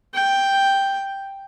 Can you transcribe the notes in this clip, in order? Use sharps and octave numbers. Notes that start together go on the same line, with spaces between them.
G5